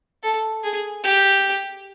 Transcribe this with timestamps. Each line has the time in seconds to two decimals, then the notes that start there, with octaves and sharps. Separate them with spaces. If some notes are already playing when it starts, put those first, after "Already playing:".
0.23 A4
0.64 G#4
1.04 G4